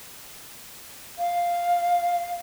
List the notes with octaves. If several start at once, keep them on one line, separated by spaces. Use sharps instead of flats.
F5